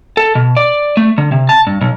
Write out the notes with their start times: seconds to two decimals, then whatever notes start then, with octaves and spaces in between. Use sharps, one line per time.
0.17 A4
0.35 B2
0.57 D5
0.97 A3
1.18 D3
1.32 C3
1.49 A5
1.67 G2
1.81 B1